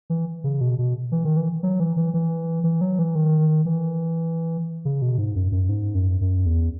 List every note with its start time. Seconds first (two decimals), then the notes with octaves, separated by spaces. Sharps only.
0.10 E3
0.44 C#3
0.61 B2
0.78 B2
1.12 E3
1.24 D#3
1.37 E3
1.63 F#3
1.80 E3
1.97 E3
2.14 E3
2.64 E3
2.81 F#3
2.99 E3
3.15 D#3
3.66 E3
4.85 C#3
5.02 B2
5.18 G#2
5.35 F#2
5.52 F#2
5.69 G#2
5.95 F#2
6.21 F#2
6.46 E2